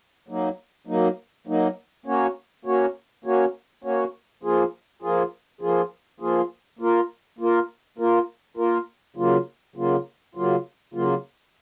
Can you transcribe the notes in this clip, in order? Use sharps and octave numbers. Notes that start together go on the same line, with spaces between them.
F#3 A#3 D#4
F#3 A#3 D#4
F#3 A#3 D#4
A#3 C#4 F#4 C#5
A#3 C#4 F#4 C#5
A#3 C#4 F#4 C#5
A#3 C#4 F#4 C#5
F3 A#3 F4 G#4
F3 A#3 F4 G#4
F3 A#3 F4 G#4
F3 A#3 F4 G#4
A#3 F4 A#4
A#3 F4 A#4
A#3 F4 A#4
A#3 F4 A#4
C#3 F#3 A#3 F4
C#3 F#3 A#3 F4
C#3 F#3 A#3 F4
C#3 F#3 A#3 F4